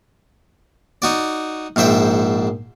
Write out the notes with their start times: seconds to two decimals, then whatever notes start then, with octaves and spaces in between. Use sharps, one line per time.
1.02 D#4 F#4 D5
1.76 A#1 G#2 C5 E5 G5